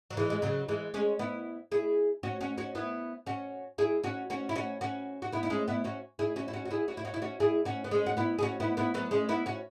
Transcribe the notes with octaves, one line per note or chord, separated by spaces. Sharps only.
F#3
E3 G#3
G#3
C#3 F#3
E3 G#3
G#3 C#4
B3 E4
E4 G#4
C#4 F#4
C#4 F#4
C#4 F#4
B3 E4
C#4 F#4
E4 G#4
C#4 F#4
C#4 F#4
E4
C#4 F#4
C#4 F#4
F#4
B3 E4
E4
G#3 C#4
B3 E4
C#4 F#4
E4 G#4
C#4 F#4
E4
C#4 F#4
F#4
E4 G#4
C#4 F#4
E4
C#4 F#4
E4
C#4 F#4
E4 G#4
C#4 F#4
B3
G#3 C#4
F#4
B3 E4
G#4
C#4 F#4
B3 E4
B3 E4
F#3 B3
G#3 C#4
B3 E4
C#4 F#4